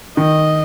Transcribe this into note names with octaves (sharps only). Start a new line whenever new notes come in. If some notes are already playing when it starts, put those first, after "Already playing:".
D#3 D#5